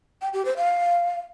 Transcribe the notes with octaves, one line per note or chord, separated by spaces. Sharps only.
G5
G4
C5
F5